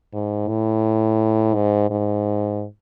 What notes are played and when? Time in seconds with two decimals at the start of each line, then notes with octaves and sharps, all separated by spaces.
0.13 G#2
0.48 A2
1.55 G#2
1.90 G#2